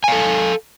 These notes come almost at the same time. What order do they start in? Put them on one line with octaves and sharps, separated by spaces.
G#5 F5 A4